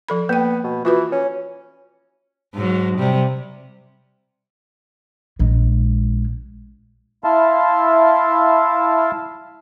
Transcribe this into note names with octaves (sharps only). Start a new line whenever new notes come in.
F3 A4 B5
A#3 B3 G5
B2
E3 F4 F#4 B4
C#4
G#2 F#3
C3 G3
A#1 G#3
E4 E5 F5 A5 C6